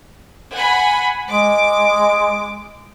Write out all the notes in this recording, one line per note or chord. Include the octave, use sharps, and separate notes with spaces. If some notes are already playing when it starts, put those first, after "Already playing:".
F#5 G#5 B5
G#3 D6